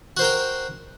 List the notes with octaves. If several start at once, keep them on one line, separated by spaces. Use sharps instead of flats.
F#4 A#4 C5 G5